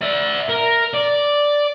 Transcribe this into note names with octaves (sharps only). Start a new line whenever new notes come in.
D5 E5
A#4
D5